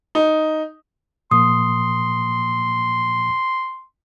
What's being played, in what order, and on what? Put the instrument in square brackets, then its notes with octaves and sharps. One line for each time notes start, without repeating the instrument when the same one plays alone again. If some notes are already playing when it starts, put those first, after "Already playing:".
[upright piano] D#4
[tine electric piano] A#2 F3 A#3 [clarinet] C6 [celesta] D#6